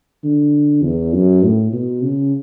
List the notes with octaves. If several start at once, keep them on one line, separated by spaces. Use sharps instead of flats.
D3
E2
F#2
A2
B2
C#3